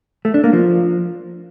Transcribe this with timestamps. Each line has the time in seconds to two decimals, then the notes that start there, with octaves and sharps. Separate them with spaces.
0.25 A3
0.34 D4
0.44 A#3
0.53 F3